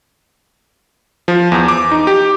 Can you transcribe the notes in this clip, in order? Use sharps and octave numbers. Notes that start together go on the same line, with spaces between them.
F3
E2
D6
D#4
G4